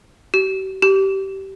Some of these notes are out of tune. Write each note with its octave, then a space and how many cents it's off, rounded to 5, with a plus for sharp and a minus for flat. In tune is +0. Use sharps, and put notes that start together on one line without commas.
G4 -45
G4 -20